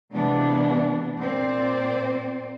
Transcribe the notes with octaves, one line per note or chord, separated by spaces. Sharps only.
C3 E3 G#3 A#3 B3 D4
A#2 C4 C5 D5